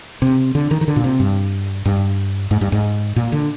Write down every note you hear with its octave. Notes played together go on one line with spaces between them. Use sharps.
C3
D3
D#3
D#3
D3
A#2
C3
G2
G2
G#2
G2
G#2
A#2
D3